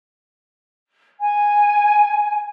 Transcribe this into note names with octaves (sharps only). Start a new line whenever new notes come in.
G#5